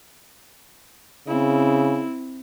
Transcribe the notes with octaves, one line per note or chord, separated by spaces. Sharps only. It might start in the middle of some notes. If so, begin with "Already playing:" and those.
C#3 C4 E4